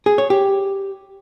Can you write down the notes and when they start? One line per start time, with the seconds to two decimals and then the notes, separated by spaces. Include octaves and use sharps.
0.06 G#4
0.18 C#5
0.30 G4